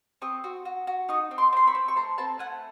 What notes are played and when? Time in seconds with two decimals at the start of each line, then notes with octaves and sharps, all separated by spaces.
0.22 C4 C#6 D#6
0.44 F#4
0.65 F#4
0.87 F#4
1.09 D#4 C#6 D#6
1.31 C4
1.38 C6 D6
1.53 C4 C6
1.67 B5 C#6
1.75 C4
1.88 C#6
1.96 A3 A#5 C6
2.18 C4 A5 B5
2.39 A3 F#5 G#5